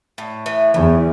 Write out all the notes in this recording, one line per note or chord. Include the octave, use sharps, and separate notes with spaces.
A2
E3
E2 A2